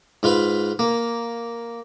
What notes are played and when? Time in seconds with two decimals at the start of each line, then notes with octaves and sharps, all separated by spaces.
0.23 G#2 F4 B4 F5
0.79 A#3